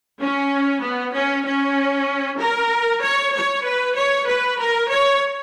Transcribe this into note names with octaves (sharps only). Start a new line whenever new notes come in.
C#4
B3
C#4
C#4
A#4
C#5
C#5
B4
C#5
B4
A#4
C#5